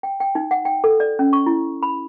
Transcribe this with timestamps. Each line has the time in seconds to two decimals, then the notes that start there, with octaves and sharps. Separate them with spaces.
0.03 G5
0.20 G5
0.35 D#4
0.51 F#5
0.65 G5
0.84 A4
1.00 D5
1.19 C#4
1.33 C#6
1.46 E4
1.83 B5